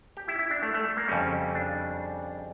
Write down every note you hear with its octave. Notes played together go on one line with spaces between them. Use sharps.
G4
E4
E4
D4
A3
A3
A#3
F2 C#3 G3 C#4
D4